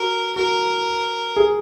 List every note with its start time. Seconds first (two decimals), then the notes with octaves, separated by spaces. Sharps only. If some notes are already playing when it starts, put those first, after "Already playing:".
Already playing: F#4 A#4
0.36 F#4 A#4
1.36 G#4